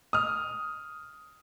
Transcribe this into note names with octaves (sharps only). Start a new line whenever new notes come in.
D#6 F6